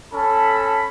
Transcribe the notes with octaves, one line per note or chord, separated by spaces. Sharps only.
C#4 A4 A5 B5